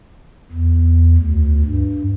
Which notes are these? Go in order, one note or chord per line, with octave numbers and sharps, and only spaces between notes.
E2
D2
G2